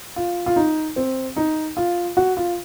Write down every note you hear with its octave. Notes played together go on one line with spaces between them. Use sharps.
F4
F4
D#4
C4
D#4
F4
F#4
F4